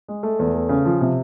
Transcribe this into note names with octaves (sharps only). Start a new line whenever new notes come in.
G#3
A3
E2
A3
C#3
F3
C3